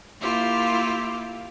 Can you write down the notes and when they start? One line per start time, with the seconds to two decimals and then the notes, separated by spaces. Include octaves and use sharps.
0.20 A#3 E4 F4 G4